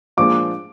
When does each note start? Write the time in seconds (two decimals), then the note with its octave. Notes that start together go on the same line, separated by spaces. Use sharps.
0.17 A#2 F3 G#3 D4 F4 D6